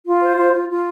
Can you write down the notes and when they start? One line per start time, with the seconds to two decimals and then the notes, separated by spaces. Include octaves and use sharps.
0.07 F4
0.23 C5
0.38 F4
0.53 F4
0.69 F4